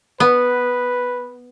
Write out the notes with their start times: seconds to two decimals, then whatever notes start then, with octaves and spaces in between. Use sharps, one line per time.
0.20 B3 B4